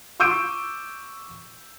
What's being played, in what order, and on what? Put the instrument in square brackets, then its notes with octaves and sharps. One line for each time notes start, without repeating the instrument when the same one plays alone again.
[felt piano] C#6 D6 E6 G6 D7 D#7